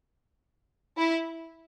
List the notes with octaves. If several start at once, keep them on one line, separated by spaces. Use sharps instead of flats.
E4